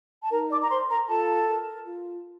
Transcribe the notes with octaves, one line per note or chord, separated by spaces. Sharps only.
A5
D#4 A#4 A#5
D5 D6
A#5
A#4 C5 C6
A#4 A#5
F4 A4 A5
A#4
F4